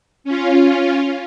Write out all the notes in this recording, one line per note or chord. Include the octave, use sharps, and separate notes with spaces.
C#4 F4